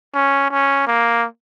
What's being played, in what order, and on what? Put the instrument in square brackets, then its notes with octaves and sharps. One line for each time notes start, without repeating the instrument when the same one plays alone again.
[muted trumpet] C#4
C#4
A#3